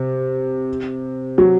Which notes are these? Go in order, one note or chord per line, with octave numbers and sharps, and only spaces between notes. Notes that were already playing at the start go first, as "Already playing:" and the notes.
Already playing: C3
F#3